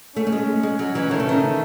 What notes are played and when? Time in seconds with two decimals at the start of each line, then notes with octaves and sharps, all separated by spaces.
0.16 A3 C#4
0.27 A3
0.32 G#3
0.63 G#3
0.79 F#3
0.95 E3
1.11 D#3 A3
1.20 C#3
1.29 D#3